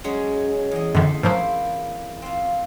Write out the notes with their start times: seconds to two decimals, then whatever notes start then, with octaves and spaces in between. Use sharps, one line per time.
0.04 F#3 G#3 C#4
0.71 E2 D#5
0.95 F#2 D3 D#3 A3 C4
1.23 G#2 F3 F#3 A#3 E4 C5
2.22 C4 F4